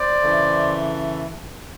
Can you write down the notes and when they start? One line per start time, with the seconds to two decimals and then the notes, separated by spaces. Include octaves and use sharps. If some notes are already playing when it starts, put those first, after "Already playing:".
Already playing: C5 D5
0.22 C#3 E3 A3